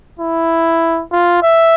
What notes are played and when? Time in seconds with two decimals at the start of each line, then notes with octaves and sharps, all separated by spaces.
0.19 E4
1.12 F4
1.43 E5